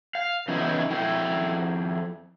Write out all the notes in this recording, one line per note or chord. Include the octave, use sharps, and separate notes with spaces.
F5
C#3 E3 B3 D#4 E4
F2 E4 G5